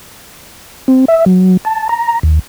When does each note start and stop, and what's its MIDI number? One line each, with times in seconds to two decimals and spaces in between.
0.88 1.05 60
1.08 1.25 76
1.26 1.57 54
1.65 1.88 81
1.89 2.19 82
2.23 2.39 39